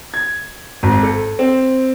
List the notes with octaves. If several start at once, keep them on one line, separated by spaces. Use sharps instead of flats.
G#6
G#1
A4
C4